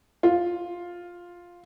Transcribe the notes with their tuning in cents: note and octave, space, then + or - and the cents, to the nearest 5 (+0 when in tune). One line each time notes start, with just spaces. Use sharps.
F4 +5